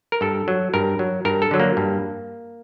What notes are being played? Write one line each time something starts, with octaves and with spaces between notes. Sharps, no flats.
A#4
G2 A4
F#3
G2 A#4
F#3
G2 A#4
A4
D3 F#3
A#3
G2